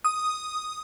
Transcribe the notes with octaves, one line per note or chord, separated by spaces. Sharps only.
D#6